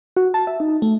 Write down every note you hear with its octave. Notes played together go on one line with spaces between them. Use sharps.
F#4
A5
E5
D#4
A3